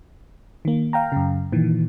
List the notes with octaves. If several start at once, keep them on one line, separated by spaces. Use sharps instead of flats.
D#3 A#3
F5 G5 A#5
F#2 C#3
A#2 D#3 E3